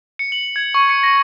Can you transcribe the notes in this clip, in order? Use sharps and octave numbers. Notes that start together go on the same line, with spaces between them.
C#7
F#7
G#6
C#6
C#7
A#6